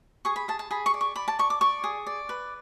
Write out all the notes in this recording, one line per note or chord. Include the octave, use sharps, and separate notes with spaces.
G#4 C#6
B5
G#4 A5
A5
G#4 B5
C#6
D5
C#6
D5 B5
A5
D5 C#6
D6
D5 C#6
G#4
D5
B4